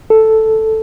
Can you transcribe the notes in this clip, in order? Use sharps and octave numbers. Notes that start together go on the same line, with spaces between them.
A4